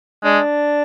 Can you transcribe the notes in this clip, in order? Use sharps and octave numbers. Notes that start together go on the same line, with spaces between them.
G#3 D4